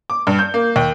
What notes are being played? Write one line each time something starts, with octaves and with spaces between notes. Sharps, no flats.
D6
G2
G6
A#3
D#2